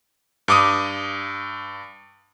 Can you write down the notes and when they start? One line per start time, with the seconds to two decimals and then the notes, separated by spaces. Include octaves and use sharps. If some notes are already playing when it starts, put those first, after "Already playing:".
0.48 G2 D6 D#6